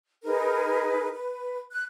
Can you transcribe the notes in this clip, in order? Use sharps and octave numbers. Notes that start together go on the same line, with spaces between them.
D#4 G#4 A#4 B4
B4
F#6